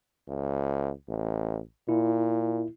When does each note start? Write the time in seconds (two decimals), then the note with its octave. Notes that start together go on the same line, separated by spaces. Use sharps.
0.28 C#2
1.08 A1
1.89 A#2 E4